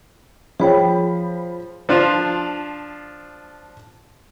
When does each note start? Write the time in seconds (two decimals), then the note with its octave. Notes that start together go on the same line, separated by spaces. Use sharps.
0.60 F3 G#4 C#5 G5 B5
1.89 F3 D4 F4